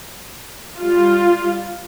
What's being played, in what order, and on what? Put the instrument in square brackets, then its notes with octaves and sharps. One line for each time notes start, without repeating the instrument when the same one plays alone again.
[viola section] G3 F4